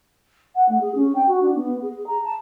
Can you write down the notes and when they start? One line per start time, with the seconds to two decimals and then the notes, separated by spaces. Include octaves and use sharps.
0.55 F#5
0.68 A3
0.81 G#4
0.95 C#4
1.15 G5
1.27 F#4
1.42 D4
1.55 B3
1.82 G#4
2.06 A#5
2.24 A5